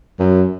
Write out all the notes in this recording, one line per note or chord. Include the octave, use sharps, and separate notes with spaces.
F#2